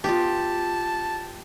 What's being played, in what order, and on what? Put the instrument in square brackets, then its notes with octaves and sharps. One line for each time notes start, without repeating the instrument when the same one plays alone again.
[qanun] B3 F4 [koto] G4 [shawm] A5